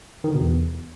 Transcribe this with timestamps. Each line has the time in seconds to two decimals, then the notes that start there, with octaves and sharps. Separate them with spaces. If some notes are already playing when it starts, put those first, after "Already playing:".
0.24 D#3
0.29 D3
0.35 B2
0.40 E2